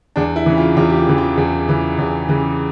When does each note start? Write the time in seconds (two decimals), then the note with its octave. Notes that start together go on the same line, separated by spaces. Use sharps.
0.16 E2 D4
0.36 E4
0.46 C#3 E3
0.57 F4
0.76 E2 F4
0.90 G4
0.97 F4
1.07 C#3 E3
1.18 F4
1.37 E2
1.68 C#3 E3
1.98 E2
2.29 C#3 E3